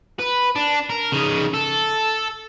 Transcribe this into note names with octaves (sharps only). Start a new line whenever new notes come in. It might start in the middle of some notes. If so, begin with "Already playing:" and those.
B4
D4
A#4
C#3 D#4
A4